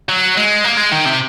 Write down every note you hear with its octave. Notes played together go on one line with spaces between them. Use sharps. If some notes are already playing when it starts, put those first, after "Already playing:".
F#3
G#3
A#3
G#3
D#3
C3